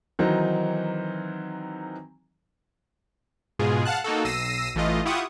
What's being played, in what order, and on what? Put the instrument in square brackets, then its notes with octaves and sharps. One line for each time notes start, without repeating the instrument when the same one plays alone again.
[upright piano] D#3 E3 F#3 C4 D#4
[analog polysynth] G#2 B2 G#3 F4 G#4
F5 F#5 A5 F#6
A#3 D#4 F#4 A4
B1 E6 A#6 C7 D#7
A1 E3 A3 F4 D#5
E4 F4 G4 F#5 C#6 D#6